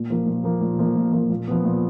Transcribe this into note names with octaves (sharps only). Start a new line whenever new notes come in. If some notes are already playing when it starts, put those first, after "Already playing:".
Already playing: A#2
F3 A#3
A#2
F3 A#3
A#2
F3 A#3
A#2
F3 A#3
A#2
F3 B3
A#2